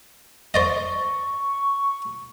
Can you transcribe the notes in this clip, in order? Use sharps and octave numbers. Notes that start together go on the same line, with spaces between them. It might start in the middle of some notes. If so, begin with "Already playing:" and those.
C5 D5 D#5 C#6